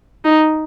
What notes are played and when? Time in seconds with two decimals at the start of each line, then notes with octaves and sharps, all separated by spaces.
0.24 D#4